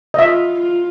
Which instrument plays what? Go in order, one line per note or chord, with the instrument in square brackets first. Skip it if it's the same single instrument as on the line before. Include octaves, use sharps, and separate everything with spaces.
[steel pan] D#5
[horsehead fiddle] F4 [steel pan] E5
[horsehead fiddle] F4